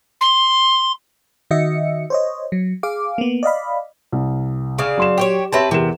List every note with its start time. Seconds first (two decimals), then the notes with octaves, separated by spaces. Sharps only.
0.21 C6
1.51 D#3 F#4 D#5 E5 C#7
2.10 C5 C#5 D#5
2.52 F#3
2.83 G#4 F5 D6
3.18 A#3 B3
3.43 D5 D#5 F5 B5
4.12 C2
4.78 C#3 D5 F5
4.98 F#3 C6 E7
5.18 G4 C5 C#5
5.52 C4 G4 B4 C#5 E5 A5
5.71 E2 C3 A#4 E7